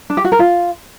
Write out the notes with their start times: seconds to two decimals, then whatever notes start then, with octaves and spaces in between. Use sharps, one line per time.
0.10 D4
0.17 G4
0.24 F#4
0.32 A#4
0.39 F4